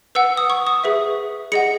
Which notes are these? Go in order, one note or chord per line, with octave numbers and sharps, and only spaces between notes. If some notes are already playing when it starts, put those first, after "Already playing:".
B4 F#5 E6
D#6
C#6
D#6
G#4 B4 E5
G#4 D#5 F#5 C#7